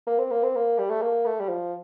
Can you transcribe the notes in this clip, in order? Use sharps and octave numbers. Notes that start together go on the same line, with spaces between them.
A#3
C4
A#3
C4
A#3
G3
A3
A#3
A3
G3
F3